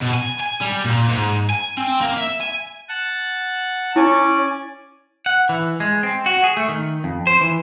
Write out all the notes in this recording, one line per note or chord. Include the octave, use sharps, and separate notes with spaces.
B2
G#5
G#5
G3
A#2
G#2
G#5
C4
A#3
E5
G#5
F#5 A5
C#4 E4 D5 G#5
F#5
E3
G#3
C4
F#4
G#4
A3
D#3
F2
C5
E3